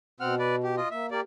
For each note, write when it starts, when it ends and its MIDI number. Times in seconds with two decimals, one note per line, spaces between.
0.20 0.80 47
0.20 0.35 60
0.20 0.35 78
0.20 0.35 89
0.39 0.56 71
0.39 0.56 74
0.63 0.75 67
0.77 0.88 65
0.77 0.88 75
0.91 1.10 58
0.91 1.06 76
1.11 1.20 58
1.11 1.22 67
1.11 1.20 74